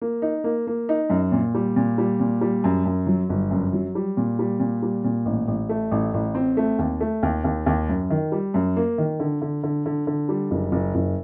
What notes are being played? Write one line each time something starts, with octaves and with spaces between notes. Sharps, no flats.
A#3
D#4
A#3
A#3
D#4
F#2
A#2
G3
A#2
G3
A#2
G3
F#2
F#2
F#3
G1
F#2
F#3
G3
A#2
G3
A#2
G3
A#2
A1
A1
A3
A1
A1
C4
A3
D#2
A3
D#2
D#2
D#2
F#2
D#3
G3
F#2
A#3
D#3
D3
D3
D3
D3
D3
G3
F#1
F#1
F#1